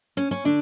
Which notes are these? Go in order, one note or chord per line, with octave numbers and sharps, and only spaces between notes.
C#4
C#4
D3 D4